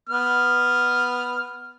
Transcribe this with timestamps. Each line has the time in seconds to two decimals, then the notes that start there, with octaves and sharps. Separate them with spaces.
0.09 B3 F6